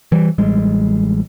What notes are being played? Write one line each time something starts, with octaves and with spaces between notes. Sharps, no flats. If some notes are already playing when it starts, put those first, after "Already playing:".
E3 G3
A1 G3 G#3